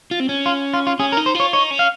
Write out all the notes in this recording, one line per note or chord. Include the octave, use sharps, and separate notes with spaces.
F4
C4
C#4
F4
F4
F4
C#4 G#4
A#4
D#4
C5
F4
C#5
D#4 C#5
C#4
F5